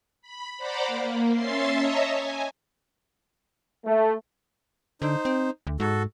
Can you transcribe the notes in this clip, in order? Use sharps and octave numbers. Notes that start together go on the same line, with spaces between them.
B5
C5 D5 F#5 A#5 B5 D6
A#3
C#4 E5 C6 A6 C7
C#5 D#5 E5 A5 A#5
G#5
A3
D3 D#4 C5
C4
D2
G#2 F#4 A4